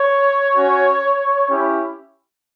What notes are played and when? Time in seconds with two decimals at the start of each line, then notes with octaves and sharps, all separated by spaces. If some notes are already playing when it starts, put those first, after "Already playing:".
Already playing: C#5
0.56 C#4 F#4
1.49 C#4 E4 G4